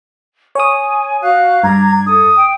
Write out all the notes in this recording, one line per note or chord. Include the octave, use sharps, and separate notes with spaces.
C#5 G#5 D#6
F#4 F5 F#6
G2 D4 A#5 G#6
A4 D#6
G5